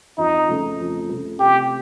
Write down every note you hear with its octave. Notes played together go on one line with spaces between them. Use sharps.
F2 D#4
C#3 F3 A3
F2
C#3 F3 A3
C3 G4